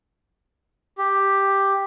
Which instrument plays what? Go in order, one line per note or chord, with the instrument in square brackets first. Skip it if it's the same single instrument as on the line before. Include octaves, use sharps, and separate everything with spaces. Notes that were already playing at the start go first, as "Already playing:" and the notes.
[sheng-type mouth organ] G4